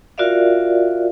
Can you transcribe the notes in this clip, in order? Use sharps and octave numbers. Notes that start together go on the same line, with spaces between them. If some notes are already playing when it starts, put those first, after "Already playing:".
F4 F#4 A#4 D5 E5 F5